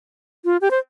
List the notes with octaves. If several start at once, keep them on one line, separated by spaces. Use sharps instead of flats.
F4
G4
C5